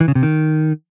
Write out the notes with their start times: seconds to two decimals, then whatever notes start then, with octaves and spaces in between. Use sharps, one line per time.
0.01 E3
0.08 C#3
0.15 C3
0.23 D#3